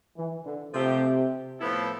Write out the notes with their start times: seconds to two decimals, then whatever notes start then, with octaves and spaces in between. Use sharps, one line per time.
0.17 E3
0.45 D3
0.74 C3 F3 A3 C4 G4
1.60 A2 F3 B3 E4 A4